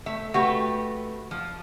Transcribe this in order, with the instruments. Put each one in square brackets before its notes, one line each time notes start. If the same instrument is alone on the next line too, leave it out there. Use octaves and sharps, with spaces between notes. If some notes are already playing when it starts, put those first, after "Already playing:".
[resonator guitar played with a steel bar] A3 E5
[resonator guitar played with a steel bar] A3 G4 B4 [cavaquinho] F#4
[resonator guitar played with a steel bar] F3